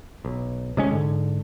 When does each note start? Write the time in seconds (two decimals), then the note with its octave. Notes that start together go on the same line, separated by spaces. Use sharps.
0.25 B1
0.77 C3 G#3 C#4
0.91 G#2 D3